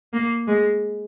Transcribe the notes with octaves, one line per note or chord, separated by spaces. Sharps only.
A#3
G#3